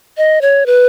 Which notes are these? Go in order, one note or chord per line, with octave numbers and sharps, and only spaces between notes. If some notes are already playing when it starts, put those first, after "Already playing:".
D#5
C#5
B4